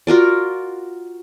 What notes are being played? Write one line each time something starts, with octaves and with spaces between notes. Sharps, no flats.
F4 F#4 A#4 D5